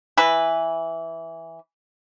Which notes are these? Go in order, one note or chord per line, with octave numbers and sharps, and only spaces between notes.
E3 B4